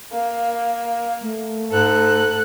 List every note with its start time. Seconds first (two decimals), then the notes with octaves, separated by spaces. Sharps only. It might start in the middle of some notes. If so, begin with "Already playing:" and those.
0.12 A#3 F5
1.22 A3
1.71 G#2 A4 F#6